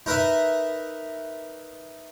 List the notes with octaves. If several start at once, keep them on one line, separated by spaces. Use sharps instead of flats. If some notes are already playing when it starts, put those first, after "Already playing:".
D#4 A#4 B4 D#5 E5